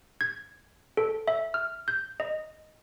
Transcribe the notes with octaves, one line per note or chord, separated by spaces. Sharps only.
G#6
A4
E5
F6
G6
D#5